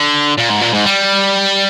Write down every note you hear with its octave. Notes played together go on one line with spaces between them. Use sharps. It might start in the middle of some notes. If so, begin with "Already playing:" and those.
Already playing: D3
A#2
G#2
A#2
G#2
G3